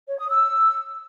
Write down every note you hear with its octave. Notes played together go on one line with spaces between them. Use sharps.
C#5
D#6
E6